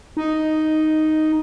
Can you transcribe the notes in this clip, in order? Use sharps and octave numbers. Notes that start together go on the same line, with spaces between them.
D#4